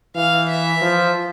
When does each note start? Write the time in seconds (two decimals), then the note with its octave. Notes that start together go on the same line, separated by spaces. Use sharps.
0.15 E3 F5
0.48 E5
0.82 F3